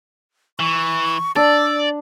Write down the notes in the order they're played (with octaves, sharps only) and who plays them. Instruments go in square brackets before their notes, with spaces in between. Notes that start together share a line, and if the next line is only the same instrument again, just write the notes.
[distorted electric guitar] E3 [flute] C#6
[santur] D4 [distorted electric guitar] D5 [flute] E6